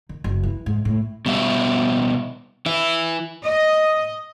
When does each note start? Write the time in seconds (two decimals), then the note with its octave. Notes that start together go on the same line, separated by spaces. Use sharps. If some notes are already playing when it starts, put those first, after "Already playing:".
0.09 D#3
0.24 F#1
0.43 E3
0.66 G#2
0.85 A2
1.26 B2 G3 E5
2.66 E3 E4
3.46 D#5